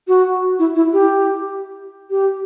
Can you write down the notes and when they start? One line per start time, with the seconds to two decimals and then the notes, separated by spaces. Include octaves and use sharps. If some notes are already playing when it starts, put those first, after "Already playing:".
0.08 F#4
0.59 E4
0.75 E4
0.93 G4
2.10 G4